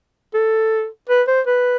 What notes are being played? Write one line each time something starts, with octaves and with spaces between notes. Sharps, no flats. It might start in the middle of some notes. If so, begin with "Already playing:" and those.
A4
B4
C5
B4